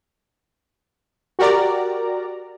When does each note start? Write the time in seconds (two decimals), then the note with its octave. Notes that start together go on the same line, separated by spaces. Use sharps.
1.39 F#4 G4 A#4 D5 A#5